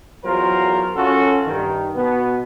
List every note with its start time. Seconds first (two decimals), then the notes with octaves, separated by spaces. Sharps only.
0.24 E2 F#3 F4 A#4 C5
0.96 F#2 C#4 F4 F#4 A4
1.47 G2 D#3
1.96 B2 B3